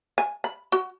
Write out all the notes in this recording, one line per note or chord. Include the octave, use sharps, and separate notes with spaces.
G#5
B5
F#4